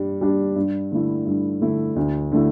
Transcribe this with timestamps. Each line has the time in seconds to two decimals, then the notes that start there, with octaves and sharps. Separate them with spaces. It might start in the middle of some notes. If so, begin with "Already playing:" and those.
Already playing: G2 G3 D4
0.21 G3 D4
0.56 G2
0.91 D3 A3 E4
1.26 G2
1.61 D3 A3 E4
1.96 D2
2.32 D3 A3 E4